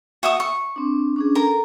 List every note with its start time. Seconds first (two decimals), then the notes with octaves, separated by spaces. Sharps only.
0.23 F#4 E5 D#6
0.40 C#6
0.76 C4 D4
1.16 C#4 D4 G#4
1.35 A4 A#4